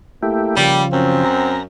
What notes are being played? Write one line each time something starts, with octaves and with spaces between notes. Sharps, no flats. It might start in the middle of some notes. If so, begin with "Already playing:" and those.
A3 A#3 E4 G4
C#3 F3 G3
F#2 C4
A#5